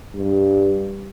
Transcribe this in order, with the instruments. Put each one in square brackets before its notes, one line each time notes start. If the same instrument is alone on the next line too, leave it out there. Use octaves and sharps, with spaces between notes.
[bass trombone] G2